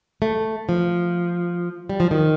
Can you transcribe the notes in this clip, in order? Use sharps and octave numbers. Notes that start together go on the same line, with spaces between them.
A3
F3
G3
F3
D#3